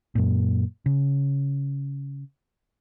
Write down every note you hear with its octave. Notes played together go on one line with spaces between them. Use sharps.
F#2 A#2
C#3